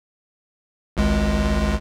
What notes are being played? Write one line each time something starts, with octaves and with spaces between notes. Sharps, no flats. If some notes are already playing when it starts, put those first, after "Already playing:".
G#1 C#2 G#3